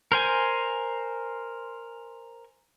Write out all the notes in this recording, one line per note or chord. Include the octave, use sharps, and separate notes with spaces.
A#4 C5 G#5